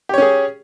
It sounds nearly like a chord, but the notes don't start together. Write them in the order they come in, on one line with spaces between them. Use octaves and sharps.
G4 C#5 C#4 G#4